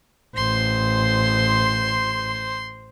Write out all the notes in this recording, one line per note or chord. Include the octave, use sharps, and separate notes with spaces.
A1 C5 C6